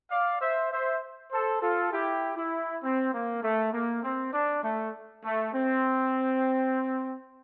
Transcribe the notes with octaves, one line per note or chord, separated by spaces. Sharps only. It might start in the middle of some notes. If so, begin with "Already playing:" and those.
D5 F5
C5 E5
C5 E5
A4 C5
F4 A4
E4 G4
E4
C4
A#3
A3
A#3
C4
D4
A3
A3
C4